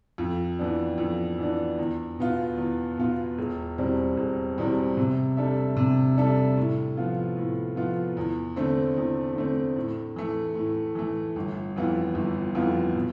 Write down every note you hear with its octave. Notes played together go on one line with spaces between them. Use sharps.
F2
E3 B3 D4
F2
E3 B3 D4
E2
B2 B3 F4
E2
B2 B3 F4
E1
E2 B2 G3 C4
E1
E2 B2 G3 C4
C3
G3 D4 A4 E5
C3
G3 D4 A4 E5
A2
F3 B3 F4
A2
F3 B3 F4
E2
D3 A3 C4
E2
D3 A3 C4
A2
E3 A3
A2
E3 A3
G1
F2 E3 B3 F4
G1
F2 E3 B3 F4
B2